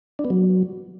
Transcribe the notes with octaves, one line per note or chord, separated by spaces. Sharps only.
D4
B3
F#3